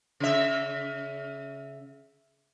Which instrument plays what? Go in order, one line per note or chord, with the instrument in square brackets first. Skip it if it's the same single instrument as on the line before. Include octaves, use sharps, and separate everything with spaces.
[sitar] C#3 E5